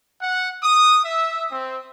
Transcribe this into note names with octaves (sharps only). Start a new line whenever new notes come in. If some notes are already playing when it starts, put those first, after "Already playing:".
F#5
D#6
E5
C4